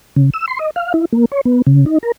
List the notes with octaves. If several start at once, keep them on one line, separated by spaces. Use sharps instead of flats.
C#3
E6
C6
D#5
F5
E4
A#3
C#5
B3
C#3
D#4
A#4